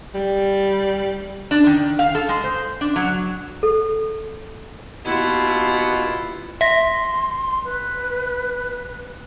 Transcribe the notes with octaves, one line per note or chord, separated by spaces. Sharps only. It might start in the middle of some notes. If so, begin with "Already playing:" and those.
G3
D4
D#3
F5
A4
G#3
C5
D4
F#3
A4
D#2 B2 E4 F4
E5 C6 A#6
B4